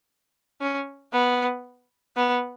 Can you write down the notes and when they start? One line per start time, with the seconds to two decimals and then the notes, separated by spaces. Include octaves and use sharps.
0.61 C#4
1.13 B3
2.16 B3